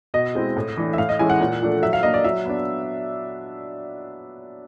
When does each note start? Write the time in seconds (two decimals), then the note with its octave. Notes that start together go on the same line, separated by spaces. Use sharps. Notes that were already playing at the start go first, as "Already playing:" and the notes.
0.14 B2 D#5
0.35 G#3 C4 E4
0.56 A2
0.77 E3 A3 D4
0.93 E5
0.98 A2 F5
1.09 D#5
1.19 E3 G#3 C#4 E4 G#5
1.30 F#5
1.41 A#2
1.62 F3 A3 D4
1.83 F#3 E5
1.93 F5
2.03 A#3 D4 D#5
2.14 D5
2.24 F#3 E5
2.46 B3 D4